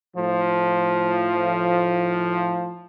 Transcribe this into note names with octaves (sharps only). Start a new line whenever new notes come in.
A2 F3